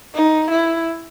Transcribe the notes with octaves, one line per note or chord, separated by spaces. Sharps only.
D#4
E4